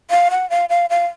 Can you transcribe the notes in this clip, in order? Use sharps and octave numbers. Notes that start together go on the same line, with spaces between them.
F5
F#5
F5
F5
F5